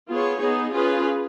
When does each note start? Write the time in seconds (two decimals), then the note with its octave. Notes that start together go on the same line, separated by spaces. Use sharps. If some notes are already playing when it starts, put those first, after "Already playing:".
0.10 B3 F4 G#4 C#5
0.41 B3 D#4 G#4
0.74 C#4 F4 G#4 B4